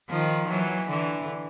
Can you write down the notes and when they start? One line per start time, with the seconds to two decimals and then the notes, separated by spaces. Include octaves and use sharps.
0.09 D#3 F3
0.49 E3 F#3
0.89 D3 E3